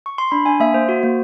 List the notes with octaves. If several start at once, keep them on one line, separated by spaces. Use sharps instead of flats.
C#6
C6
D4 B5
D4 G#5
A#3 E5
A#3 C5
F#4
A#3